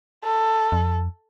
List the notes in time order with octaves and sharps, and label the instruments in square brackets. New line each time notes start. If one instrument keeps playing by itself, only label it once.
[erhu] A4
[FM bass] F2